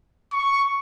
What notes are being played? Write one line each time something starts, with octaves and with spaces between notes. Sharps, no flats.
C#6